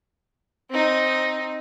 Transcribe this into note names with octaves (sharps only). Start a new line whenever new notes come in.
C4 D#4